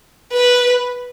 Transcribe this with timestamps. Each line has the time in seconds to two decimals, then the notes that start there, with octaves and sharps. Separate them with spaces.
0.32 B4